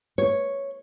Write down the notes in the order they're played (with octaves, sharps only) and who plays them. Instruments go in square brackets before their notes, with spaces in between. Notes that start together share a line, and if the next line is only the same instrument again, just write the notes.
[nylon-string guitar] C#5